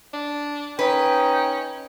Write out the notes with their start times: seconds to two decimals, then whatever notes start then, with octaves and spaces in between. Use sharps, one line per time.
0.13 D4
0.79 C#4 D#4 B4 G5